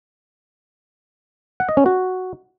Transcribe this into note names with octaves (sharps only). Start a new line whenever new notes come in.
F#5
D#5
C#4
F#4